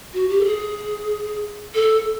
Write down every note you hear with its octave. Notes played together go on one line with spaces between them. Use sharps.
F#4
G4
A4
G#4
A4